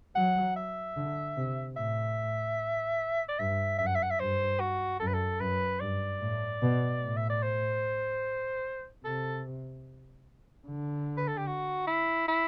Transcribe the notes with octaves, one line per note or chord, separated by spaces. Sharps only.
F#3 F#5
E5
D3
C3
A2 E5
D5
G2 E5
F#2 E5
F#5
E5
F#5
E5
G2 C5
F#4
F#2 A4
B4
A4
F#2 B4
G2 D5
A2
B2
A2
E5
D5
C5
C3 A4
D3
B4
A4
G4
F#4
E4
E4